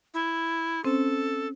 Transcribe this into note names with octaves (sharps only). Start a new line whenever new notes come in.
E4
C4 C#4 A4 C5